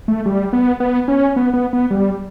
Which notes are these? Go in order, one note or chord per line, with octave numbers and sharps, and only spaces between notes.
A3
G3
B3
B3
C#4
B3
B3
B3
G3